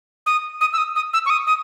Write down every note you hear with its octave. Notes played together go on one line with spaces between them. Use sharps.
D#6
D#6
E6
D#6
D#6
E6
C#6
D#6
D#6